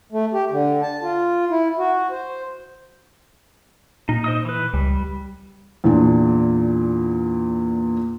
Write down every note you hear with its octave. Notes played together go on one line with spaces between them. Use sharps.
A3
G4
D3
A5
F4
E4
F#4
C5
A#2 D#4
C5 D#5 D#6
E3 B4
C#2 G3
E2 A#2 D4